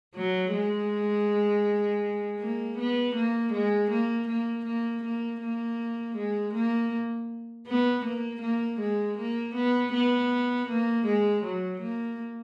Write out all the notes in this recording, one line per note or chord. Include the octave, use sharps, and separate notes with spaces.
F#3
G#3
A#3
B3
A#3
G#3
A#3
A#3
A#3
A#3
A#3
G#3
A#3
B3
A#3
A#3
G#3
A#3
B3
B3
A#3
G#3
F#3
A#3